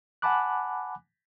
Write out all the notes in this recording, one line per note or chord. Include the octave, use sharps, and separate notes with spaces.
F#5 G#5 A5 B5 D6 F#6